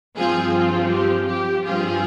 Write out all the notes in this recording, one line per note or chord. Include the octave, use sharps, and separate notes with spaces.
G2 F3 C4 F4 G#4
F4
G4
G4
G2 F3 C4 F4 G#4